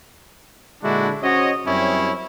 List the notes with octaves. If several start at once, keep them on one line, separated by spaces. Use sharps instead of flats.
A#2 D3 G#3 D4 E4 F#4
C#4 F#4 C5 C#5 D#5
F#2 G3 C4 C#4 E4 C#5